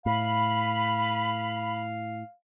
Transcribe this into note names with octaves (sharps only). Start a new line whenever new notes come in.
A2 F5 B5